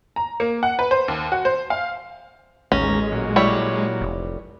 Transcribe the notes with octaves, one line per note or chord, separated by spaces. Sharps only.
A#5
A#3
F#5
B4
C5
D#2
F#4
C5
F5
A1 D#2 G#3 C#4 A#5
A#2 F#3
G3 E4 C#5
F1